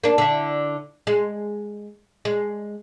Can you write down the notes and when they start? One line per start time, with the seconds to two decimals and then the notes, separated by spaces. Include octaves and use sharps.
0.04 A#3 D4
0.18 D3 E4
1.07 G#3
2.25 G#3